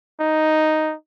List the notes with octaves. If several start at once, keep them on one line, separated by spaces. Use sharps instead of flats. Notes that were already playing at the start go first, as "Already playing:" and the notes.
D#4